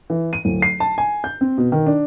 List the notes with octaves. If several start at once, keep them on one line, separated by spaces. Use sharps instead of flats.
E3
D#7
D1
C7
A5
G#5
G6
C4
B2
D#3
D4